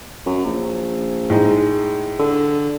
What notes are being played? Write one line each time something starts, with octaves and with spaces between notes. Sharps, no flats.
F#2
A#1
A2 G#3 D#4
D3